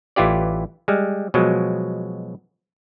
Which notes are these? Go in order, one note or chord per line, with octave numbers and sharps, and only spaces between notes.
A1 E3 E4 F4 G4 D5
G3 G#3
B2 F3 F#3 G#3